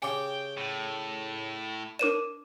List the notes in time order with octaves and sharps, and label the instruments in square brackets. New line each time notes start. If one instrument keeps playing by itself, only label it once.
[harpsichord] C#3 G4 [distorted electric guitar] G5 [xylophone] G#5 D6
[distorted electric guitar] A2
[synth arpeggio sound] D4 A#4 C#5 [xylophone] D6 D#7 E7